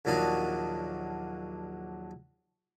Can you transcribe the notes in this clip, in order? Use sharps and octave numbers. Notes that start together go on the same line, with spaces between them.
A#1 D#2 F#3 D4 D#5 F5